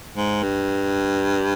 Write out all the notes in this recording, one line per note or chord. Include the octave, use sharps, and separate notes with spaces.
G#2
G2